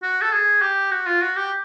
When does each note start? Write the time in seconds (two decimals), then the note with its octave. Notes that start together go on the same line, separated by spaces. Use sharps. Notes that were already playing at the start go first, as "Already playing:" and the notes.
0.02 F#4
0.22 A4
0.32 G#4
0.62 G4
0.91 F#4
1.06 F4
1.21 F#4
1.36 G4